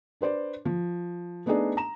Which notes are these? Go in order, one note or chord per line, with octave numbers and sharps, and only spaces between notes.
D4 B4 C5 D5
F3
A3 B3 D4 D#4 G#4 D5
A#5 E7